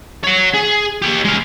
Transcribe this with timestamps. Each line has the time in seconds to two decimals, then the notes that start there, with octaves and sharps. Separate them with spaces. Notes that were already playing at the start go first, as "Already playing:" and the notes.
0.24 C#5 F#5
0.54 G#4
1.02 G4 C#5
1.25 G#3 F5